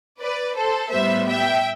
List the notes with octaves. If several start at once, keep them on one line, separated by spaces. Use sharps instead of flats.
B4 D5
A4 C5
A2 G3 B3 C5 E5
E5 G5